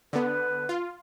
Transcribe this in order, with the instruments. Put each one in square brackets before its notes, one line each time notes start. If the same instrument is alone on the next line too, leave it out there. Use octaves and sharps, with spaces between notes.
[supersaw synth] D3 B3 [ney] B4
[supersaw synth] F4